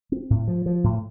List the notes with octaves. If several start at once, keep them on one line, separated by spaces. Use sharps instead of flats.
C4
A2
F3
F3
A2